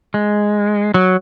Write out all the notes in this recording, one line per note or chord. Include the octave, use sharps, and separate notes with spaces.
G#3
F#3